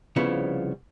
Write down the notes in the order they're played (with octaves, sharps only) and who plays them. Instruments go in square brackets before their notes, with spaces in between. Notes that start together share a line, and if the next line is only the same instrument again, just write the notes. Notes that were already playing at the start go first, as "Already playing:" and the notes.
[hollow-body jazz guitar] C2 C#3 F3 B3 E4 C#5